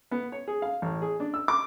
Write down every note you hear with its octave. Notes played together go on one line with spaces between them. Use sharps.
B3
C#5
G#4
F5
A1
G#4
D4
E6
D6